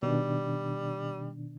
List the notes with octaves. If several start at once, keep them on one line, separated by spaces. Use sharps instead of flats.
B2 D#3 G3 D4